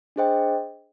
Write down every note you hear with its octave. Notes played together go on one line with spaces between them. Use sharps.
D4 G#4 C5 D#5 G5